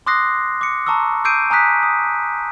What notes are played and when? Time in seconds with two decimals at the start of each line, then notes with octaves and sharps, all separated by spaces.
0.07 C6 D6 D#6 F#6 A#6 C7
0.61 D6 C#7
0.86 A5 A#5 C#6 D6 E6
1.25 D6 E6 G6 C7 D7 D#7
1.50 G#5 A#5 D#6 F#6 B6
1.83 D#6